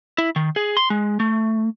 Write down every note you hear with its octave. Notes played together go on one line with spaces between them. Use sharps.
E4
D#3
G#4
C6
G#3
A3